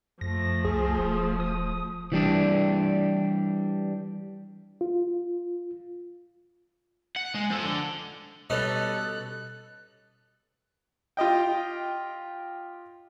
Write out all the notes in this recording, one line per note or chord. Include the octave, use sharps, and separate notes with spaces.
F#2 F3 A3 A#6
C2 G#4
D#1
D#6
E3 G3 D4
F4
F#5
G#3
F3 A4
D3
B2 G3 C#4 D#4 A4 B4 D#5 F#6
F4 G4 D#5 G5